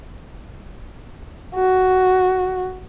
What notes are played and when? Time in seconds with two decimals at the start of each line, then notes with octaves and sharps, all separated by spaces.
1.55 F#4